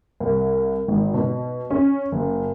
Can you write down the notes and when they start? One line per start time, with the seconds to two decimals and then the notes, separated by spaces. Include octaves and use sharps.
0.20 C2
0.88 G#1
1.14 B2
1.71 C#4
2.12 F#1